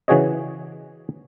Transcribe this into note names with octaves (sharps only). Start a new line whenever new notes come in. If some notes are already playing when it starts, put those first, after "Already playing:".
C#3 E3 F#4 G#4 C#5 D#5